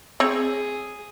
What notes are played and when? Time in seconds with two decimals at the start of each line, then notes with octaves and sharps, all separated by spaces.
0.20 C4 G#4 C#5